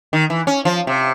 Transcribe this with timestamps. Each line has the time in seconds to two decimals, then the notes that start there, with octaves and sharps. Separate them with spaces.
0.13 D#3
0.30 E3
0.47 C#4
0.65 F3
0.87 C3